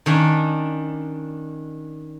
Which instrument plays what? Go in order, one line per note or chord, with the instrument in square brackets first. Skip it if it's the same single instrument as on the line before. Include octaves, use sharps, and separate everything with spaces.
[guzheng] D#3 C#4 D4